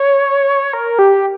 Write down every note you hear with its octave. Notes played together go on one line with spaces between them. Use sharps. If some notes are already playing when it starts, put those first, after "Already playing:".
Already playing: C#5
A#4
G4